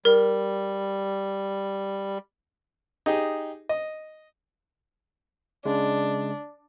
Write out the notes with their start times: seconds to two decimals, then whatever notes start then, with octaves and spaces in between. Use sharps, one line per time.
0.05 G3 A#4
3.06 D#4 G4 G#4
3.69 D#5
5.65 C#3 G#3 D4